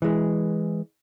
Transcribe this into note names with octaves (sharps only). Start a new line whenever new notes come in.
E3 G#3